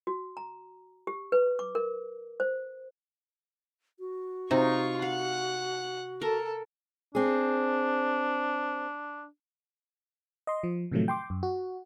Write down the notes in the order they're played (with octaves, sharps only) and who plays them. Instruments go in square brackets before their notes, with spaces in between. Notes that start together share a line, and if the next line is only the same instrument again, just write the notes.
[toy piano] F#4
A#5
G4
B4
D6
A#4
C5
[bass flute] F#4
[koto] C3 [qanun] D#4 [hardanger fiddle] F4 C#6
[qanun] F5 [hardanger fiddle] F#5
[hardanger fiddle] A4 [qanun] A#4
[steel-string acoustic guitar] C4 G#4 [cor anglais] D4
[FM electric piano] D#5 C6
F3
A2 C3 D#3 F3 F#3 A3
G5 C6 D6
F#2
F#4